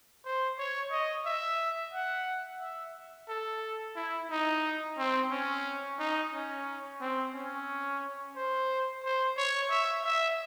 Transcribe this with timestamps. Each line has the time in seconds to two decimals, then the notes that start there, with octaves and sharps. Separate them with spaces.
0.25 C5
0.59 C#5
0.91 D#5
1.26 E5
1.93 F#5
2.61 E5
3.29 A4
3.96 E4
4.31 D#4
4.98 C4
5.31 C#4
5.99 D#4
6.33 C#4
7.01 C4
7.35 C#4
8.36 C5
9.04 C5
9.37 C#5
9.71 E5
10.05 E5